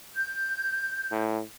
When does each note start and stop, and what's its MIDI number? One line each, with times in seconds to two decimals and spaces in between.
0.15 1.19 91
1.11 1.41 45